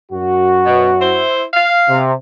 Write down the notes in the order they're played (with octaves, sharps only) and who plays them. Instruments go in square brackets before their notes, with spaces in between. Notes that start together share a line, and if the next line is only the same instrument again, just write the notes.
[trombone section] F#2 F#4
[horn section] B2
E4 C5
F5
[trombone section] C3